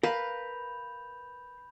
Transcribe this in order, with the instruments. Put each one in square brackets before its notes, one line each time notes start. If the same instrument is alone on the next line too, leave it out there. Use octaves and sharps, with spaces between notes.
[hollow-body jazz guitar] A#4 F5 [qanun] B4 [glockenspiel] B5 G6 F7